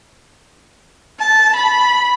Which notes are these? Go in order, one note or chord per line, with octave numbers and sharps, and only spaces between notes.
A5
B5